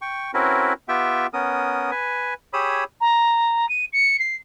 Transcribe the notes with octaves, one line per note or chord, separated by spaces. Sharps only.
G5 C#6
C4 C#4 E4 F#4 A#4 B4
B3 F4 G4 E5 G5
B3 C#4 A#4 D#6
B4 G#5
G4 G#4 C#5 B5 D#6 E6
A#5
D#7
C#7
C7